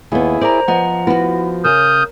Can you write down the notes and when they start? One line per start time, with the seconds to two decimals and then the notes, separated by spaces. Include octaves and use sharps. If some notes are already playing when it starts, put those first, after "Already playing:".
0.12 D#2 B3 E4 G#4
0.41 A#4 C5 D5 A#5
0.68 F3 B3 D#5 F#5 A#5
1.07 B3 E4 F#4
1.65 C#3 A#4 D#6 F6 G6